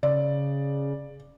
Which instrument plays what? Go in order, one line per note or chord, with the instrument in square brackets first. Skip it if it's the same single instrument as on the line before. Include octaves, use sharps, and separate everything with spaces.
[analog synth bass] C#3 [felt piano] D5